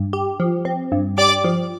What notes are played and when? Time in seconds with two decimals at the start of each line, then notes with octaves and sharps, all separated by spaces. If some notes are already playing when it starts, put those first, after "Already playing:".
Already playing: G2
0.13 G4
0.40 F3
0.65 C4
0.92 G2
1.18 G4 D5 D6
1.44 F3